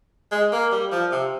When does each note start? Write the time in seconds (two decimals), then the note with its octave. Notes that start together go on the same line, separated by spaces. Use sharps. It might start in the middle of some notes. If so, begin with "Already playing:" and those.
0.32 G#3
0.52 A#3
0.72 G3
0.92 F3
1.12 C3